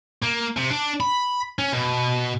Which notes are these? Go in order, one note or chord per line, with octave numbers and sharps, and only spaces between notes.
A#3
C3
D4
B5
C#4
B2